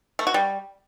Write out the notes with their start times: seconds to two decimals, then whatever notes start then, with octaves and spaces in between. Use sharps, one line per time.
0.19 A3
0.27 F#4
0.34 G3